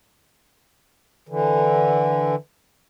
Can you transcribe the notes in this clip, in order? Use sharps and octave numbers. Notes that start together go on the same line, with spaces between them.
D3 E3